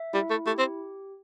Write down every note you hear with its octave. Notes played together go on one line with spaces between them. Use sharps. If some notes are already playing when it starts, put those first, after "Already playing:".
Already playing: E5
G3 E4
A3
A3 G4
C4